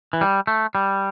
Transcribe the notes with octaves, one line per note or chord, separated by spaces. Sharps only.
E3
G3
A3
G3